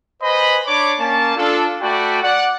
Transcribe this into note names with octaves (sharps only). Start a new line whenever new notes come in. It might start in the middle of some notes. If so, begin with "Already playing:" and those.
B4 C5 D#5 G#5 B5
D4 C#5 D5 B5 D6
A#3 C#4 A5
D4 F4 A4
A3 F#4 D5 G5 A5 B5
D5 F#5